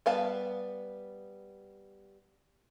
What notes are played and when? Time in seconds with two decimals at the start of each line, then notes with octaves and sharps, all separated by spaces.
0.06 G3 B3 F5 A5